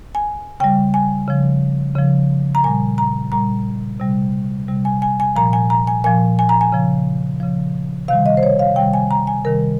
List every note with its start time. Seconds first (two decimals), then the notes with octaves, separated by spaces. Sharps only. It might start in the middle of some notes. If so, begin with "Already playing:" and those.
0.15 G#5
0.60 C#3 G3 G5
0.94 G#5
1.28 C#3 F3
1.96 C#3 F3
2.55 A#5
2.64 A#2 G3 G#5
2.98 A#5
3.32 A#2 G3 A#5
4.00 C3 G3
4.68 C3 G3
4.85 G#5
5.02 G#5
5.20 G#5
5.36 A#2 F3 A#5
5.53 G#5
5.70 A#5
5.87 G#5
6.04 A#2 F3 G#5
6.39 G#5
6.49 A#5
6.61 G#5
6.72 C#3 F3
7.40 C#3 F3
8.08 C3 D#3 G3 F5
8.26 D#5
8.37 C5
8.43 C#5
8.59 F5
8.76 C3 D#3 G3 G5
8.94 G#5
9.11 A#5
9.27 G#5
9.44 C3 D#3 G3 A#4